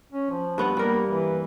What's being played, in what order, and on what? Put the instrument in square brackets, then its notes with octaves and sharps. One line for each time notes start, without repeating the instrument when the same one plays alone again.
[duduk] C#4
F3
[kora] G2 B3 F#5
[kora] G3 A#4 [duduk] A#3
[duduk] E3